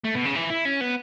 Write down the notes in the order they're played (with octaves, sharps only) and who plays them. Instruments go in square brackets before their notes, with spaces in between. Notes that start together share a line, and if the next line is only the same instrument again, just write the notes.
[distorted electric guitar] A3
B2
C#3
E3
E4
C#4
B3